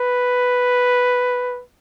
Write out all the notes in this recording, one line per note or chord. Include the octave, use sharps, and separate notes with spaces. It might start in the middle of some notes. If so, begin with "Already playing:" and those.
Already playing: B4